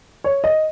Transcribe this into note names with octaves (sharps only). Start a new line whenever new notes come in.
C#5
D#5